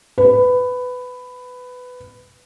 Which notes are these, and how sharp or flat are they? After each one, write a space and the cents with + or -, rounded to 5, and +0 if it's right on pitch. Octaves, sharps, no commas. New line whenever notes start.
B4 +15